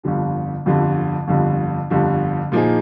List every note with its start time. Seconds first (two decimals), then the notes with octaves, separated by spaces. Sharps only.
0.03 G1 F2 D3 G3
0.66 G1 F2 D3 G3
1.27 G1 F2 D3 G3
1.90 G1 F2 D3 G3
2.52 A#2 F3 A#3 D#4 G#4